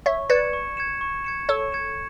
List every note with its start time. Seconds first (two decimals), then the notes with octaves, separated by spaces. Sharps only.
0.06 C#5 E5 C#6
0.30 B4 D5 G#6 C#7 E7
0.53 C#6
0.77 G#6 C#7 E7
1.01 C#6
1.24 G#6 C#7 E7
1.49 A4 C#5 C#6
1.72 G#6 C#7 E7